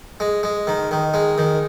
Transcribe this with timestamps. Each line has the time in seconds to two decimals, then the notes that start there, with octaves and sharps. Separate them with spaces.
0.20 G#3
0.43 G#3
0.67 D#3
0.91 D#3
1.14 G#3
1.38 D#3